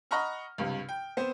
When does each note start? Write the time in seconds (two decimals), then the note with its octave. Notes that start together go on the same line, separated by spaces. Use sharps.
0.11 D#5 F#5 A#5 B5 C#6 F6
0.58 C#2 G2 C3
0.89 G5
1.17 B3 C4 C5